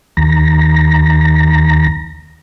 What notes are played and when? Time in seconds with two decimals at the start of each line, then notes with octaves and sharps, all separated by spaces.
0.17 D#2 A#5